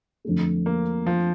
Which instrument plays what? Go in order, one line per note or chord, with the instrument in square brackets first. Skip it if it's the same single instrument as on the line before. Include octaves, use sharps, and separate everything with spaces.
[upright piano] F2 D3 A3
[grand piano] A#3
F3